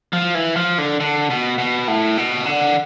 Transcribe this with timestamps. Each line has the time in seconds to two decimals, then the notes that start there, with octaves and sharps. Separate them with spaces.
0.13 F3
0.35 E3
0.56 F3
0.78 D3
1.00 D3
1.30 B2
1.58 B2
1.88 A2
2.17 B2
2.46 D3